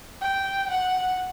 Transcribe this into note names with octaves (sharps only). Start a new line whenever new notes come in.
G5
F#5